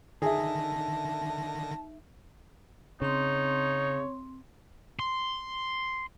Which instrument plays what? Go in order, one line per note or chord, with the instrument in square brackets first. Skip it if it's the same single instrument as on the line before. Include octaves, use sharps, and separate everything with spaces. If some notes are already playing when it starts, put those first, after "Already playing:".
[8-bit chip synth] D3 D#3 A#6 [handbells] D#4 E5 [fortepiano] G#4 [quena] A5
[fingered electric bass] C#3 [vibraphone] C4 C6 [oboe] D#4 [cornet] C#5
[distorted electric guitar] C6